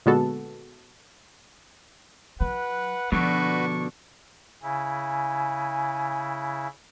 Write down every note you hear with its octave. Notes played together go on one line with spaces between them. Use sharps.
A#2 D3 G#3 B3 F#4 A4
F#3 B4 F#5
B2 D3 F3 D4 F#4 B4 C#6
C#3 E4 G#5